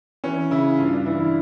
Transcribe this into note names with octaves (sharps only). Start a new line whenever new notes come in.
E3 C#4
C#3 E4
G2 F4
D4
E3 E4
E4